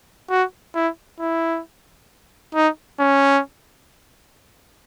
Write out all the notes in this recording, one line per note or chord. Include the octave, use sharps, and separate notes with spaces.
F#4
E4
E4
D#4
C#4